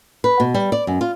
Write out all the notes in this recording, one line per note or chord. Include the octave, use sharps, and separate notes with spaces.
B4
B2
G3
D5
F#2
F4